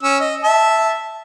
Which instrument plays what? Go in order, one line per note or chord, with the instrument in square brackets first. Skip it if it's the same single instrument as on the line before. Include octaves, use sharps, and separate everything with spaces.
[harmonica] C#4 E6
D#5
E5 A5